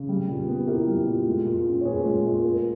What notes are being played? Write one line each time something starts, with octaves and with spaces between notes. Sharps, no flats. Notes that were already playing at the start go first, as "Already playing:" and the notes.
Already playing: C#3
G3
A#2
B3
E4 G4 A#4
G3
A#2
G#3
A#2
C#4
C#5
A#2 G#4 B4
G#3
A#2
A#3